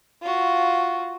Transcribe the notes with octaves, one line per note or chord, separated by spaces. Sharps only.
F4 F#4